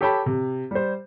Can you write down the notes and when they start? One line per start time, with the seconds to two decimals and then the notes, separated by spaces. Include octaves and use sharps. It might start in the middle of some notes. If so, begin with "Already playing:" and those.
0.01 G4 A4 C#5 G5 A5 B5
0.26 C3
0.71 G3 C5